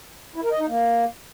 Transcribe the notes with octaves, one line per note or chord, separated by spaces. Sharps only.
E4
A#4
D#5
D#4
A#3